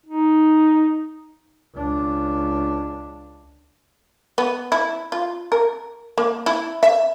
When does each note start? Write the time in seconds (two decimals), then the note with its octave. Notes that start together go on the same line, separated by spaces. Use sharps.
0.06 D#4
1.74 C#2 D4
4.38 B3
4.72 E4
5.12 F4
5.52 A#4
6.18 A#3
6.46 E4
6.83 E5